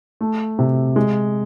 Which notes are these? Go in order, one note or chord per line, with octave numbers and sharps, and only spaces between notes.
A3
C3
G#3